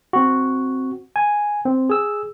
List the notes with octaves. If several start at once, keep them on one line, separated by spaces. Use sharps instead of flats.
C4 F#4
G#5
C4
G#4 E6